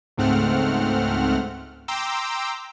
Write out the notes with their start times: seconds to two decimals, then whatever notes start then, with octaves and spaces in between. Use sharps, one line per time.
0.17 C#2 G#2 A3 C4 F#5 F6
1.88 G5 A#5 C6 D6 E6